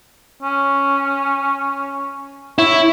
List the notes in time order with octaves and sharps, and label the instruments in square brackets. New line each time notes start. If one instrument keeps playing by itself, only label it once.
[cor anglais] C#4
[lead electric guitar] E4 [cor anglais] C#5